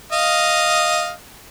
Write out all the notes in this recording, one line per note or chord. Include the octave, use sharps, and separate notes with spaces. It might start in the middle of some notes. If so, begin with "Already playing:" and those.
D#5 F5